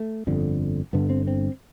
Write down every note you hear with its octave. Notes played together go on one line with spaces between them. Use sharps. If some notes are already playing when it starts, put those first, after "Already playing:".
Already playing: A3
G1 F2 D3
G1 G2 D3 B3
C4
C4